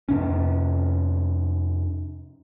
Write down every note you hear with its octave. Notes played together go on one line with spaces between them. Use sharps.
F2 C3 C#4